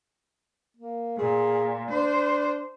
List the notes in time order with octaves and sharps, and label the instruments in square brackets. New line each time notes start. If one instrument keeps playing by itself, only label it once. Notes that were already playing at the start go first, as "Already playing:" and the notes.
[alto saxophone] A#3
[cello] A#2 [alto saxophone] G#4
[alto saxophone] D4 [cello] C5